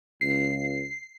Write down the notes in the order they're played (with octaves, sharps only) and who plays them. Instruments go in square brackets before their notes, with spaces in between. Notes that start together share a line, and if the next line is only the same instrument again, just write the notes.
[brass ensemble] C#2 [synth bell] C7